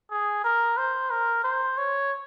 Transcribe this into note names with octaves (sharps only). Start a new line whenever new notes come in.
G#4
A#4
C5
A#4
C5
C#5